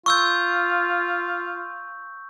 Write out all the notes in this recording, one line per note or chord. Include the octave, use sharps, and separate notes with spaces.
F4 C#6 E6 G6